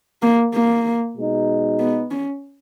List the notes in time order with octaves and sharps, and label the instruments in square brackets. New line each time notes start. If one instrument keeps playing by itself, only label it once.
[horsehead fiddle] A#3
A#3
[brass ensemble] B2 G#3 D#4
[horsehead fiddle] B3
C#4